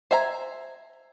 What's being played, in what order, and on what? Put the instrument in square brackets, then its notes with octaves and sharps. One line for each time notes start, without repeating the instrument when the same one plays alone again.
[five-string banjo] C5 E5 G#5 A#5